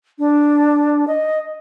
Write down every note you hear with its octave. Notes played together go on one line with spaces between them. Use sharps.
D4
D#5